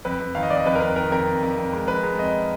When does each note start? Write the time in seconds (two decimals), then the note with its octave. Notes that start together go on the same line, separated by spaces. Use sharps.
0.05 F2 B4
0.20 F2
0.35 D#3 F5
0.43 D#5
0.50 F2 D5
0.57 D#5
0.65 F2 B4
0.75 A#4
0.81 F2 B4
0.96 D#3 A#4
1.11 F2 A#4
1.26 F2
1.43 F2
1.57 F2
1.73 G#3
1.88 F2 B4
2.03 G#3
2.18 F2 D#5